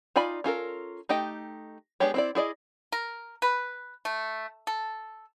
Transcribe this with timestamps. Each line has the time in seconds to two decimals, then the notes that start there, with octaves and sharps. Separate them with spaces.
0.16 D#4 F4 D5 G#5 B5
0.44 C#4 F4 A4 A#4
1.09 A3 D#4 G4 D#5 G5
2.00 G#3 B3 D4 G4 C#5
2.14 C4 E4 D5
2.35 E4 G#4 D5 D#5
2.92 A#4
3.42 B4
4.05 A3
4.67 A4